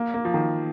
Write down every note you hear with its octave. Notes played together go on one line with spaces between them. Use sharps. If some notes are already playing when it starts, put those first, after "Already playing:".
Already playing: A#3
A#3
F3
D#3